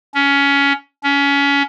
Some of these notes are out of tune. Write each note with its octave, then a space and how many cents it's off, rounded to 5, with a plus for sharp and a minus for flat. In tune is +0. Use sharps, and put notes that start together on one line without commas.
C#4 +20
C#4 +25